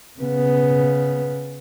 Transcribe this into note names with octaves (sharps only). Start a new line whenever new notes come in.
C#3 B3